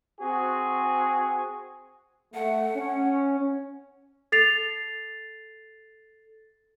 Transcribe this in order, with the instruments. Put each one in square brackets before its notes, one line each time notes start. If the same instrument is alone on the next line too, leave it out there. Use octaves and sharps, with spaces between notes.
[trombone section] C4 F#4 G#4
[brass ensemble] A3 [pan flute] F#5
[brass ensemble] C#4
[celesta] A4 A6 C7 F7